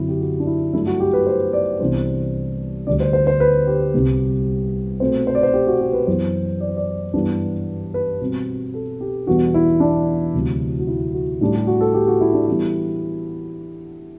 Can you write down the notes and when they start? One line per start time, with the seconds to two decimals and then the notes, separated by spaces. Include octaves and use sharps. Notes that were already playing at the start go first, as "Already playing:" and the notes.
Already playing: F#2 D3 F#3 C4 E4
0.09 G4
0.20 F#4
0.40 D4
0.47 E4
0.73 G2 F#3 A3 D4 E4
0.87 F#4
1.00 G4
1.13 B4
1.27 C5
1.53 D5
1.80 C2 C3 E3 B3 D4 C5
2.87 D2 D3 G3 D4 D5
3.00 C5
3.13 C5
3.27 C5
3.40 B4
3.67 G4
3.94 C2 C3 G3
5.00 B2 A3 C4 C5
5.27 C5
5.35 D5
5.43 C5
5.54 G4
5.67 F#4
5.81 G4
5.93 B4
6.07 F#2 E3 B3 C5
6.60 D5
6.69 C5
6.77 D5
7.14 G2 E3 G3 B3 D4
7.94 B4
8.20 B2 G3 C4
8.74 A4
9.01 G4
9.27 E2 B2 G3 B3 D4 F#4
9.54 E4
9.80 D4
10.34 D2 C3 F#3
10.80 F#4
10.87 E4
11.14 F#4
11.41 A2 G3 D4
11.54 G4
11.67 F#4
11.81 A4
11.94 G4
12.07 F#4
12.21 E4
12.34 D4
12.47 E3 G3 B3 D4 E4